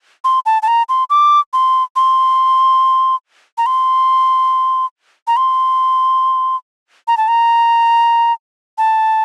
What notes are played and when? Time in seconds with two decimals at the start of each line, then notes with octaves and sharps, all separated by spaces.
0.24 C6
0.46 A5
0.62 A5
0.68 A#5
0.89 C6
1.10 D6
1.53 C6
1.96 C6
3.58 A#5
3.66 C6
5.27 A#5
5.37 C6
7.08 A#5
7.17 A5
7.28 A#5
8.78 A5